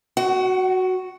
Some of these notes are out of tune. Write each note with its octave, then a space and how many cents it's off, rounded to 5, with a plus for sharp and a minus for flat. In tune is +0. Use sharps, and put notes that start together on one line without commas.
F#4 +0 F#5 +35